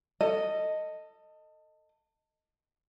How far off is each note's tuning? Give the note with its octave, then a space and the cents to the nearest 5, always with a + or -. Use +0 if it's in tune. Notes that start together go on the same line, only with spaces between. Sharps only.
A4 +25 D#5 +0